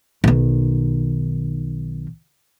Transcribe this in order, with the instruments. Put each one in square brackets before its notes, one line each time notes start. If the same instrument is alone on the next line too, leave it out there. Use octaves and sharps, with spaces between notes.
[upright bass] B1 D#3